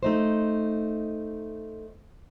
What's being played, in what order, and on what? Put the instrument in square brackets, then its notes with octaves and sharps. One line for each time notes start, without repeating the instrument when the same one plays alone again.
[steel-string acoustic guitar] A3 D#4 C5